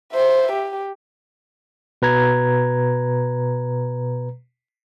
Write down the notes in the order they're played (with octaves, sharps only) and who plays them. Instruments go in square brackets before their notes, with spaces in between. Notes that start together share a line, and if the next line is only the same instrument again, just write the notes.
[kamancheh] C5 E5
G4
[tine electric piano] B2 B4 A#5 G#6